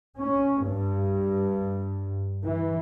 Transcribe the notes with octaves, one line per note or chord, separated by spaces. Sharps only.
C#4
G2
E3